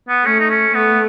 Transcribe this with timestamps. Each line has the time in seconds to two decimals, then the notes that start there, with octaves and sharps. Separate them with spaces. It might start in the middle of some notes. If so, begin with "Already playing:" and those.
0.08 B3
0.25 A3 C#4
0.39 D#4
0.50 C#4
0.74 A3 B3